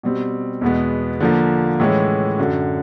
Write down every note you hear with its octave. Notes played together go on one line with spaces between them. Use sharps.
B2 G3 C4
E2 B2 G#3 B3
D3 F3 A#3
A2 E3 G#3 C#4
F#2 D3 F#3